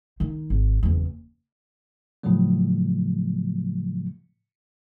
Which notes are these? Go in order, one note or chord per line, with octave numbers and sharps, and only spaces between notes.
D#3 D#4
G#1
F#1 E2
A2 C#3 F3 F#3 A3